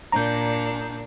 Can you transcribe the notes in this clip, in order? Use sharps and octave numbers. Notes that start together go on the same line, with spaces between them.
A#2 D4 A#5 G6